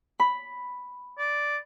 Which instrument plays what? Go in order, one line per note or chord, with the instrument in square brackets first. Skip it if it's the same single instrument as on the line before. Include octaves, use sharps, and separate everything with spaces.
[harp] B5
[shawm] D5